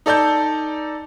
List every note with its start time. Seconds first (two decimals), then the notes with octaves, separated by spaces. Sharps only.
0.06 D#4 A4 D5 A5 G6